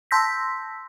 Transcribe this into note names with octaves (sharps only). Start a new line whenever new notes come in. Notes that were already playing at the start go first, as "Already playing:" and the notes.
A5 C6 E6 G6 A#6 B6